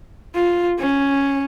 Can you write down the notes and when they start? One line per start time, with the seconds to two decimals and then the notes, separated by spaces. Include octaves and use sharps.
0.35 F4
0.79 C#4